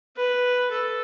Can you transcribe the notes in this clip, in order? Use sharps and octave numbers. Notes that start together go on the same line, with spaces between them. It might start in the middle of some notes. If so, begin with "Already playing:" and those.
B4
A4